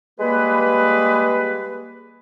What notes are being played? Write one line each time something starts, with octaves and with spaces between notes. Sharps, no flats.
G3 G#3 A#3 G#4 B4